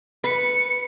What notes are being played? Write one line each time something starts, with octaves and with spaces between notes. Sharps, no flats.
B4 C#7